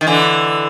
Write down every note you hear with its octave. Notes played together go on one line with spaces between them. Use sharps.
D#3
D3 E3